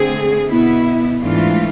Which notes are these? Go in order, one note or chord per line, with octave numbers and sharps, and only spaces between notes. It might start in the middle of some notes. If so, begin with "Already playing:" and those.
Already playing: D3 A3 C4 G#4
B2 B3 E4
G#2 E3 A3 D4 F4